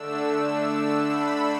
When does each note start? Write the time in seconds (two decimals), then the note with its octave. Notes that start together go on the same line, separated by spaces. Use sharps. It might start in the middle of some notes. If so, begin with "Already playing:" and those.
Already playing: D3 A3 D4 E6
1.06 B5